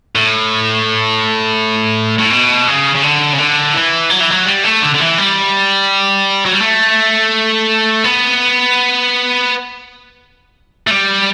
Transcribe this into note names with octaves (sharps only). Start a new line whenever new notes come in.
A2
A2
B2
C#3
C#3
D3
C#3
D3
E3
F#3
E3
F#3
G3
A3
D3
D3
E3
G3
F#3
G3
A3
B3
A3
G3